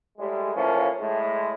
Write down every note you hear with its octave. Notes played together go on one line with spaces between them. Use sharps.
A2 G3 G#3
A2 E3 F3 A#3 C#4
A2 G#3